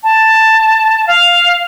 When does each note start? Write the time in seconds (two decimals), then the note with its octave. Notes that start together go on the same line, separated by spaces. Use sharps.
0.04 A5
1.07 F5